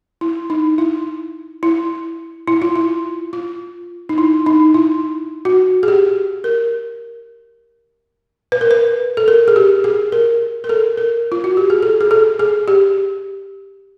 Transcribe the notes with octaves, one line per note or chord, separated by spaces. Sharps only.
E4
D#4
E4
E4
E4
F4
E4
F4
D#4
E4
D#4
E4
F#4
G#4
G4
A#4
B4
A#4
B4
A4
A#4
G#4
G4
G#4
A#4
A#4
A4
A#4
F4
F#4
G4
G#4
A4
G#4
A4
G#4
G4